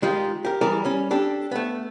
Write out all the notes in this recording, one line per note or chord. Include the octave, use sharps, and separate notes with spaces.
D#3 G#3 F4 G4
G4 A#4
E3 G3 G#4 A#4
G3 C#4
D4 G4 A4
A3 B3